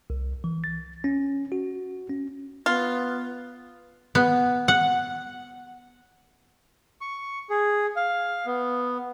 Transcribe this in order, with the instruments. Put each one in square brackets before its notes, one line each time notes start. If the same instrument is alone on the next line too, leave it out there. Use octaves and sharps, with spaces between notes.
[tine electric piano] C2
E3
A6
C#4
F#4
C#4
[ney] B3 [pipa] F4
[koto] B3
F#5
[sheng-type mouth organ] C#6
G#4
F5
B3